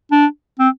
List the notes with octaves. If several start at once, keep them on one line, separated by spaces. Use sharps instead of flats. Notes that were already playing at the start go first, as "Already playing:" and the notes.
D4
C4